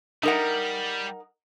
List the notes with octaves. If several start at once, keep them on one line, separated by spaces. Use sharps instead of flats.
G3 D#4 A#4 F#5